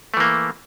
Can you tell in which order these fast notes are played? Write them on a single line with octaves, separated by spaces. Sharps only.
A3 E3 A#3